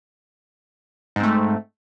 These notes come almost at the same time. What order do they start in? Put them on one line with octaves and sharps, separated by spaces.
G#2 C4 A3